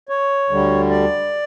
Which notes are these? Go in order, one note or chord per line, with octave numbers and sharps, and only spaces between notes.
C#5
D2 D3 G3
D5